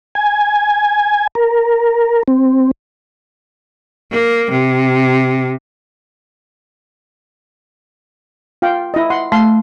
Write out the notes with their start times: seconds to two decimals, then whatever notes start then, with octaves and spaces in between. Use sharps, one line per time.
0.15 G#5
1.35 A#4
2.28 C4
4.12 A#3
4.51 C3
8.62 F4 F5 G5
8.94 E4 D#5
9.10 F#5 C6
9.32 A3 F5 C6